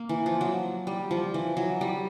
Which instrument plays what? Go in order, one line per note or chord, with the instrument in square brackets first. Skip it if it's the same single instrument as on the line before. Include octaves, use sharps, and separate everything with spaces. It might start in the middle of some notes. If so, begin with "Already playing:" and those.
Already playing: [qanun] A#3
E3
F3
F#3
G3
F3
E3
F#3
G3